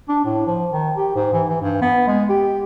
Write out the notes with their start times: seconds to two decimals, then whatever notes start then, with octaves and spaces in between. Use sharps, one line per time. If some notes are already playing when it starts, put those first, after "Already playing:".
0.09 D4
0.25 A2
0.46 F3
0.72 D#3
0.97 G4
1.15 G#2
1.34 E3
1.49 E3
1.61 G2
1.82 B3
2.08 G#3
2.29 G4